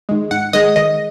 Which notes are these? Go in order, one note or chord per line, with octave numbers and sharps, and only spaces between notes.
D#3 G#3
G#2 F#5
D#3 G#3 D#5
D#3 D#5